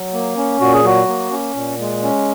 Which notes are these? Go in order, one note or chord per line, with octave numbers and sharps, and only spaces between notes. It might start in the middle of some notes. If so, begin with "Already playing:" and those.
Already playing: F#3
A#3
C#4
A#2 F#4
G#4
F#3 F#4
A#3
C#4
A#2
G#3
C#4